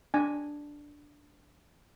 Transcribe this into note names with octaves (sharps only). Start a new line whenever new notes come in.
D4 G#5